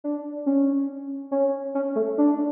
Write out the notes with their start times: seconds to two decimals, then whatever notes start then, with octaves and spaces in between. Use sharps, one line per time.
0.04 D4
0.46 C#4
1.31 C#4
1.75 C#4
1.96 A3
2.18 D4